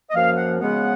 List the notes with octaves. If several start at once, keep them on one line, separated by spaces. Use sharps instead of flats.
D#5
F#2 F3 A#3 F5
F#5
C#3 G#3 B3 F#5